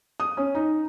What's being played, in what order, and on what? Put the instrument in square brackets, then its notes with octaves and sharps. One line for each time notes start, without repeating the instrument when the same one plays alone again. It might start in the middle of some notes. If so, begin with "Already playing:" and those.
[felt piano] D#6
C#4
D#4